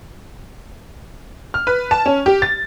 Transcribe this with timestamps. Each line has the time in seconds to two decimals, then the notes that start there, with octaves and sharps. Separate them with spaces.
1.54 F6
1.67 B4
1.91 A5
2.06 C#4
2.26 G4
2.42 A6